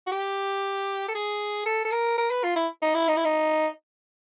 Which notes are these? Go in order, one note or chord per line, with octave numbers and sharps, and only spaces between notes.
F#4
G4
A4
G#4
A4
A4
A#4
A#4
B4
F4
E4
D#4
E4
D#4
E4
D#4